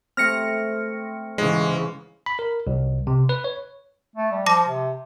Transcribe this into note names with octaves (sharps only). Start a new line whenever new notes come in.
A3 C4 F6 A#6 C#7
G#2 C#3 E3 G#3
B5
A#4
C2
C3
B4
C#5
A3
G3
F3 A5 D6 A#6
C3